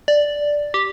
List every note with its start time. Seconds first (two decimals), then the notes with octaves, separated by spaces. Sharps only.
0.08 D5
0.74 G4